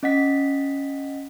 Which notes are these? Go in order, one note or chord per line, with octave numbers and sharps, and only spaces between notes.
C#4 D#5 F#5 B6